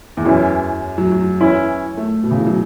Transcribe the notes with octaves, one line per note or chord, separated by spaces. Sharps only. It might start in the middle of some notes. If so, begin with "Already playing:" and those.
E2
F#2 E3 C#4 E4
F#3
F#3
E3 C#4 E4
A3
B2
C#3
E3
F#3